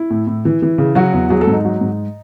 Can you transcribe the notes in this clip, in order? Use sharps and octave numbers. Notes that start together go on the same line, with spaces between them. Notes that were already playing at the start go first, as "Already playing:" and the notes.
Already playing: E4
A2
A2
E3
E3
C#3
F#3 F#4
E2
F#3 G#4
A4
G#2
D#4
F#3
G#2